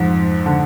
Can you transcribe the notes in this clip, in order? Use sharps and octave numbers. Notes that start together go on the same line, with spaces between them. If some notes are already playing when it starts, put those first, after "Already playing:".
Already playing: F2 G#2
D3